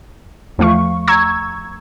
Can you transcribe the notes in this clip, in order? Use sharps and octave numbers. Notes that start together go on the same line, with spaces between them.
E2 F3 A3 F5 C#6
A#5 C#6 E6 G#6